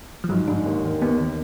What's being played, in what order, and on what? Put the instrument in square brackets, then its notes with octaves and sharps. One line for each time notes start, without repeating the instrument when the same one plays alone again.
[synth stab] F3
[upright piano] G#2 [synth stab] F#3
[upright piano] G#2 [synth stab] D4
[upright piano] D#2
D#3
[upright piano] D#2 [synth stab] B3
[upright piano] D#3